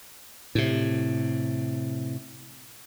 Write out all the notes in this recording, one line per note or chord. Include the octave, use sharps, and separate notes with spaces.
A2 C3